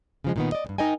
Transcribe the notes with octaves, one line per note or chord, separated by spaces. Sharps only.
C#3 F3 G#3
A#2 D#3 B3
D5 D#5
D2 G2
D#4 A#4 D#5 G5 G#5